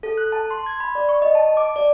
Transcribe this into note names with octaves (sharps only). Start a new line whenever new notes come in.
A4
F#6
A5
C6
G#6
B5
D5
C#6
D#5
A5
D6
D5